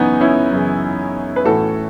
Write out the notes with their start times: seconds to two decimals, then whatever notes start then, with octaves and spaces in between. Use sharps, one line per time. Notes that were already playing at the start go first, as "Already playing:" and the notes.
Already playing: F#2 C#3 E3 B3 C#4 D#4
0.21 C#4 E4
0.52 F#2 C#3 E3
1.36 B4
1.45 A2 E3 F#4 A4